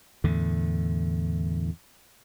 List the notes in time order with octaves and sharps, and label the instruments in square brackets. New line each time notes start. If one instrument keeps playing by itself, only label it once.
[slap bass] E2 A2 D3